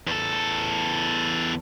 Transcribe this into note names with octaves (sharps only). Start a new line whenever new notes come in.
E2 A4